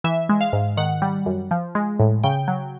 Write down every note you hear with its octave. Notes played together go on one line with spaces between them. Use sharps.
E3 E5
G#3
F5
G#2
D#3 F#5
G3
F#2
F3
G#3
A2
C#3 G5
F#3